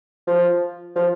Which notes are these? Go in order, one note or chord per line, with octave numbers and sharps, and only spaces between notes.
F3
F3